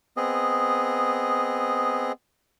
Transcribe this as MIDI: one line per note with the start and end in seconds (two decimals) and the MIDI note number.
0.17 2.12 59
0.17 2.12 60
0.17 2.12 68
0.17 2.12 75